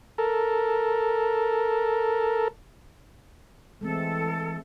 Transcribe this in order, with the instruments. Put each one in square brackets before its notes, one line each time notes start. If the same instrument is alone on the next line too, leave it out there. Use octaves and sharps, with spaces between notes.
[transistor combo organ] A4 A#4
[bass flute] E3 [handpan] G#3 A3 C4 [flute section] A4